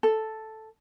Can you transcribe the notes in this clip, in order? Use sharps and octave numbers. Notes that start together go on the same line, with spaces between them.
A4